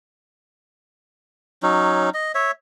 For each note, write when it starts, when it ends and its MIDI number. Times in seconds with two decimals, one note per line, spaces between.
1.63 2.10 54
1.63 2.10 61
1.63 2.10 63
2.14 2.32 75
2.35 2.51 73
2.35 2.51 76